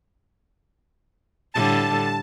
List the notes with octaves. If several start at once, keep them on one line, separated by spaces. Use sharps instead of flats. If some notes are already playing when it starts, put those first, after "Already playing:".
A2 D3 G3 A5